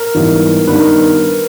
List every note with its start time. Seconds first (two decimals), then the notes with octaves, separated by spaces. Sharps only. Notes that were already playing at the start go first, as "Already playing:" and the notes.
Already playing: A#4
0.15 G#2 E3 G3 B3
0.67 G2 D#3 G3 B3 D#4 B4
0.79 A#4